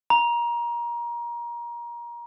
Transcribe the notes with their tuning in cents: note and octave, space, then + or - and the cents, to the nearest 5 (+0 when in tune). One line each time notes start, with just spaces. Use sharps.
A#5 +25